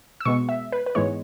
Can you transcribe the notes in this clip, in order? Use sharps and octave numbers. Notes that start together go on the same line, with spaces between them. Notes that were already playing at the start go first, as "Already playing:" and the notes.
E6
B2 G#3 B3 C#6
E5
B4
B4
G#2 E3 G#3 B3 C#5